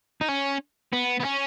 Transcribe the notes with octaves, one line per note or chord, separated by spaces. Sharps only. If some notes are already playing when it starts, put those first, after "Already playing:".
D#4
C#4
B3
B3
C#4